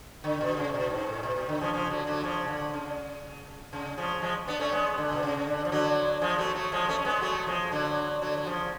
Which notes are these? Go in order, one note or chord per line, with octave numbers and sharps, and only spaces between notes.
D3
B2
C#3
B2
G#2
A2
B2
B2
D3
C#3 F3
C#3 F3
D3 F#3
D3 F#3
C#3 F3
D3
C#3
C#3
C#3 F3
F3 G#3
B3 D4
A3 C#4
G#3 B3
D3
B2
C#3
D3
F3
D3 F#3
F3 G#3
F#3 A3
F#3 A3
F3 G#3
A3 C#4
C#4
G#3 B3
F#3 A3
F3 G#3
D3 F#3
D3 F#3
F#3
C#3 F3